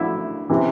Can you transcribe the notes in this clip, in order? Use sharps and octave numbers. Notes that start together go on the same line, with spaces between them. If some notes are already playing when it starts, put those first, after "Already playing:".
Already playing: D2 D3 E4 E5
C3 E3